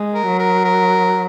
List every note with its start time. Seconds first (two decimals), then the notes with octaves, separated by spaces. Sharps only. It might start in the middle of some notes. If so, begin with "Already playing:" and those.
Already playing: G#3
0.14 A#4
0.27 F#3
0.39 A#4
0.65 A#4